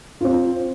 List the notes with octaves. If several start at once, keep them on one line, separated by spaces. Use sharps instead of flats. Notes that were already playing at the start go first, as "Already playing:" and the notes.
C4 F4